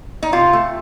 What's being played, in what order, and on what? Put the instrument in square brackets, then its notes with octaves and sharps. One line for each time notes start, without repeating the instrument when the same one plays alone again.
[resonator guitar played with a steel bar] D#4
C3 F4
A3